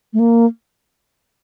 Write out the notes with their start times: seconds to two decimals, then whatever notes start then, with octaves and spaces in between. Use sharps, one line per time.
0.13 A3
0.19 A#3